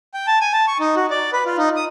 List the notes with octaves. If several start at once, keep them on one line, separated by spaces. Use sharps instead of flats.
G5
A5
G#5
A5
C#6
D#4
F#4
D5
B4
F4
D#4
D#6